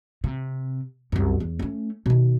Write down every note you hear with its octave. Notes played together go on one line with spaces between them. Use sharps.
C3
C2 F#2
E2
A3 C#4
B2 D#3